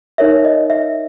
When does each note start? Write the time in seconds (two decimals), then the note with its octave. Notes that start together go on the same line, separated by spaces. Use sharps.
0.18 D#4 A#4 C#5 E5
0.45 D#5
0.70 E5